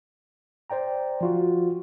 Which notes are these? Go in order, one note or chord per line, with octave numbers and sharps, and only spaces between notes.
C5 D5 G5 A#5
F3 F4 F#4